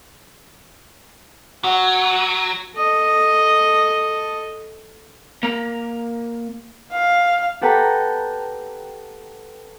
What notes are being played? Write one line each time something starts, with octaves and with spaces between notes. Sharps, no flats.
F#3 F#4
A4 D#5
A#3 A#5
F5
G4 A4 B4 F#5 G5 A#5